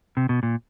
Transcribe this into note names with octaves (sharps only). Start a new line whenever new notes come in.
C3
B2
A#2